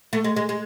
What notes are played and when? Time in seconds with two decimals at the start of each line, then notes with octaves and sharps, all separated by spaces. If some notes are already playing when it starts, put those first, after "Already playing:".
0.13 A3
0.24 G#3
0.36 G#3
0.49 G#3